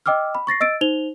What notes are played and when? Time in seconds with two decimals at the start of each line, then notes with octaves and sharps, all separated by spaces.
0.06 D#5 G5 D6 E6 F6
0.35 B5
0.47 C#6 A6 A#6 C7
0.61 D#5 E6 A6 D7
0.81 D#4 C5 F7 G7